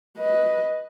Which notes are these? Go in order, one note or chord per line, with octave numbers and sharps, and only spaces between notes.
B4 D#5